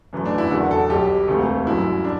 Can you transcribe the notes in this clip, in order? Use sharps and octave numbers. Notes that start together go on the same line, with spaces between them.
F#2 E3 A3
D4
E4
F#1 E2 D3 F#4
A4
B1 B2 G3 G4
E1 D2 C3 E3 A3
G1 F#2 F#3 E4
D4